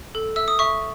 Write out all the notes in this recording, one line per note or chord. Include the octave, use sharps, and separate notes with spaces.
A4
E5 E6
D#6
E5 C#6